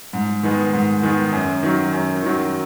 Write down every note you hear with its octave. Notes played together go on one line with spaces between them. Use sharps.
G#2
D#3 G#3 B3
G#2
D#3 G#3 B3
F#2
D#3 F#3
F#2
D#3 F#3